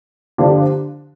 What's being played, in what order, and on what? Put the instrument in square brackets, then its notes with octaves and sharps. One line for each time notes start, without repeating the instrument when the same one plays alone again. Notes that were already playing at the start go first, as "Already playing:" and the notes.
[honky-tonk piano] D3 F3 A#3 D4 G4